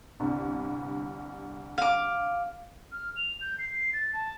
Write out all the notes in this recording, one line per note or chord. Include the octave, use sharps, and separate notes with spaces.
G1 C2 G2
F5 D6
F6
F7
G6
C7
A6
A5